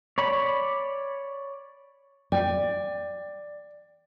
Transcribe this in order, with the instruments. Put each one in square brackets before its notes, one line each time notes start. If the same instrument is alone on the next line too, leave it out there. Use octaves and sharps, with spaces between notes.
[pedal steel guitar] C#5 D5 B5
[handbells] D5 [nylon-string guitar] G5